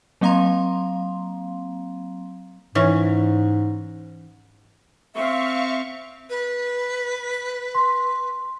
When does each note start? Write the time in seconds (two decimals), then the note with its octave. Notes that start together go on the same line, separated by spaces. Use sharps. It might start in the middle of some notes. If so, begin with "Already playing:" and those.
0.21 F#3 A#3 C4 F5 A#5 C6
2.75 G#2 E3 C#4
5.15 C4 E5 F5 C#6
6.30 B4
7.75 C6